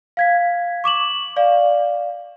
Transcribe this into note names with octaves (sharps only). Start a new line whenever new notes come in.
F5 G#6 B6
C#6 D6 E7 F#7
D5 F5